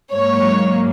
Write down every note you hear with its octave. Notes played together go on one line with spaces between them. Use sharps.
G#2 F#3 A#3 C#5